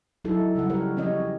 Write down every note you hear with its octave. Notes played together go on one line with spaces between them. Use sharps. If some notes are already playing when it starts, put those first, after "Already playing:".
F#3 D#4 E4 F#4 A4
C#3 G3 A4 F#5
G4 A#4 C#5
F3 C4 C#4 G4 C#5 D#5
C#4